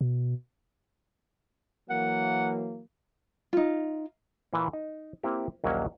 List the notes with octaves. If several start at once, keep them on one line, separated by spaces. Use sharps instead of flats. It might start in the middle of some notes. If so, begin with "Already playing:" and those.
B2
E3 F#3 A#3 F#5
D#4 F4
A#2 E3 A#3
D#4
A#3 C4 E4 G4
A#1 D#2 F#3 A#3 C#4 F#5